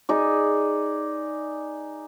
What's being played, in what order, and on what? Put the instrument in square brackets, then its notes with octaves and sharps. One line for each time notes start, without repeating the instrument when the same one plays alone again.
[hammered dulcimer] D#4 G#4 D5